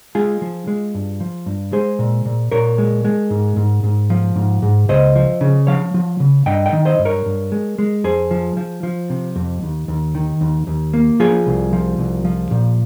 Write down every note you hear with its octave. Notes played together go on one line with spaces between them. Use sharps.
G#3 F4 G#4
F3
G#3
G2
F3
G2
G#3 G#4 C5
A#2
A#2
A#2 A#4 C#5
G#3
G#3
G#2
G#2
G#2
F3
G#2
G#2
C#2 C5 D#5
F3
C#3
F3 C#5 F5
F3
C#3
G2 D#5 G5
D#5 G5
D#3
C5 D#5
G2
A#4 C#5
G2
G#3
G#3
F2 G#4 C5
F3
F3
F3
C3
F2
D#2
D#2
D#3
D#2
D#2
A#3
F3 F4 G#4
C2
F3
C2
F3
A#2